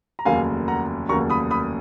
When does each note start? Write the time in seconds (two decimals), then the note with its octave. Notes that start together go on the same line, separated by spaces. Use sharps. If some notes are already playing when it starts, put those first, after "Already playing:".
0.19 A#5
0.25 F1 D#2 C#3 F#3 A#3 F5 G#5
0.68 F#5 A#5
1.09 F1 D#2 C#3 F#3 A#3 A#5 C#6
1.30 B5 D#6
1.50 B5 D#6